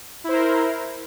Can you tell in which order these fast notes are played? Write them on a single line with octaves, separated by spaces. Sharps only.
E4 C5 A#4